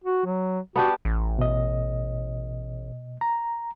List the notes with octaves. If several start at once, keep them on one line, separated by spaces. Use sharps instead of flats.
F#4
F#3
B3 D4 F#4 G4
A1
B2 D#5
A#5